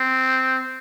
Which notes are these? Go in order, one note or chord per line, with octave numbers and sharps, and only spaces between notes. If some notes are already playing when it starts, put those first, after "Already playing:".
Already playing: C4